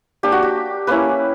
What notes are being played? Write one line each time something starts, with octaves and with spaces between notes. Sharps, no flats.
A#3 D4 G4
F#4
G4
A#3 C#4 E4 B4